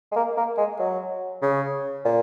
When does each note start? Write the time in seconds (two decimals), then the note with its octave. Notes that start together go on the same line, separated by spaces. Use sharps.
0.12 G#3
0.16 A#3
0.38 A#3
0.58 G#3
0.79 F#3
1.42 C#3
2.05 A#2